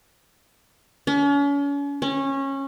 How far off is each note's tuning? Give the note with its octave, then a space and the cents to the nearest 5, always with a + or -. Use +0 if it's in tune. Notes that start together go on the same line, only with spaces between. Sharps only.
C#4 +40
C#4 -20